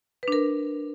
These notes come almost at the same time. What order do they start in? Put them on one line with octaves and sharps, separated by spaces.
B4 D4 A#4